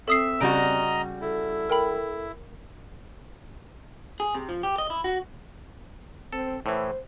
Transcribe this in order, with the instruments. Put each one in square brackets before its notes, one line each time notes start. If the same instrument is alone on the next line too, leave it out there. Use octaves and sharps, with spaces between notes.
[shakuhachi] C4 [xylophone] A4 D#6 C7 [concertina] E5 E6
[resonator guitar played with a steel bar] C#3 G3 F#4 [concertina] D#5 A#5 [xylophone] D7
[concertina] E4 [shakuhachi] A4
[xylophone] A#4 G5 B5
[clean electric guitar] G#4
C3
F3
G4
D#5
E4
F#4
[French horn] C4 [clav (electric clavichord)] A4
[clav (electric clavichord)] A2 E3 [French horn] C5